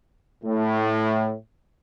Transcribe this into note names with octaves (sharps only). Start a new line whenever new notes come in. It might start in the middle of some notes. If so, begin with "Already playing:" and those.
A2